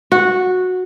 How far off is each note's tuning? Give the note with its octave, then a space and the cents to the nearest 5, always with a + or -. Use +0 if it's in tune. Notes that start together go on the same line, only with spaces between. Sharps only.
F#4 -10